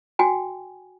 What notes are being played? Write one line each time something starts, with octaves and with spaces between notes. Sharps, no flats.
F#4 G5 G#5